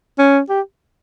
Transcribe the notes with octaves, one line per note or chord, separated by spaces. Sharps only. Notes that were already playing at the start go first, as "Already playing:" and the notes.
C#4
G4